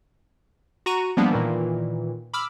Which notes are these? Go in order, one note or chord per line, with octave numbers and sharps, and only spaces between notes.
F#4 A#5 C#6 D#7
F3 G3 A#3 B3 D4
A#2 D#3 E3
B5 D6 E6 F6